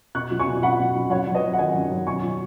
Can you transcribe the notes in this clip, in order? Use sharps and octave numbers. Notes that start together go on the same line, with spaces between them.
B2 C#6 F#6
F#3
G#5 C#6
B2
F#3 F#5 B5
B2
F#3
F#2 C#5 F#5
F#2
B4 D#5
F#3
F#5
D#3 D#5 G#5
F#2
F#2
B2 G#5 C#6
F#3